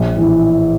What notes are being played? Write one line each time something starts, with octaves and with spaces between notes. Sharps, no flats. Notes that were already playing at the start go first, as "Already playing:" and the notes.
Already playing: A#1
A2 E3